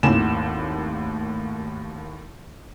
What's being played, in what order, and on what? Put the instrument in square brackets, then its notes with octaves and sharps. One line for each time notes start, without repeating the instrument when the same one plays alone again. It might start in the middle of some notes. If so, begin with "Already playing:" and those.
[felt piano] G#1 D#2 A2 E7